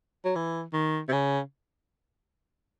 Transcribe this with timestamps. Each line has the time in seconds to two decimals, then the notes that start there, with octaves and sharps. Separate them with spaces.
0.25 F#3
0.35 E3
0.73 D#3
1.09 C3
1.13 C#3